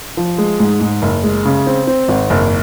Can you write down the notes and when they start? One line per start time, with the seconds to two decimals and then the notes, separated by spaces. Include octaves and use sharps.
0.17 F3
0.38 G#3
0.59 G#2
0.81 G#2
1.02 F#1
1.23 G#3
1.45 C#3
1.67 C4
1.87 C4
2.08 G#1
2.30 F#1